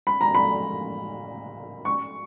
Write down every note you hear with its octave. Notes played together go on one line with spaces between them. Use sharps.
B5
A#5
B5
C#6